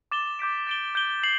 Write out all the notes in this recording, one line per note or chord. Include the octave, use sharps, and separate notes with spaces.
D6 A6 E7 G7
D6 G6 B6 D7
A6 D7 G7
G6 D7 G7
C7 F#7